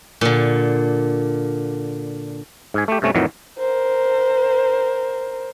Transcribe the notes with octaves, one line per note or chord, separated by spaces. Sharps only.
A#2 D3
G#2 G#5
A3 G4
G2 C3 A3 C#4
F2 A2 D#3 E3 F#3
A#4 C5